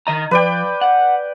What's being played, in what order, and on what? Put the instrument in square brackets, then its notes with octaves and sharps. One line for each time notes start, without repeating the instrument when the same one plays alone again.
[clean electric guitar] D#3 D#5 A#5
[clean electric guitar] F3 [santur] B4 D5 G5
[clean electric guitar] F#5